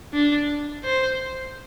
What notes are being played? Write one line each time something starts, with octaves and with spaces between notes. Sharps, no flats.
D4
C5